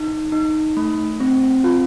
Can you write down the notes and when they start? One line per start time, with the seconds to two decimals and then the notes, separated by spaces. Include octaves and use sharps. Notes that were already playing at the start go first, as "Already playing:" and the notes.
Already playing: D#4
0.32 D#4
0.77 A3
1.20 C4
1.64 F4